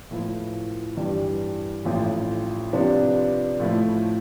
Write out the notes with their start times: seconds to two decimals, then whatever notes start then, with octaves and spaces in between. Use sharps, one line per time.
0.11 A2 F3 B3 E4
0.97 G2 E3 G3
1.85 A1 A2 F3
2.72 C3 F3 B3 D4
3.60 A2 F3 A3 E4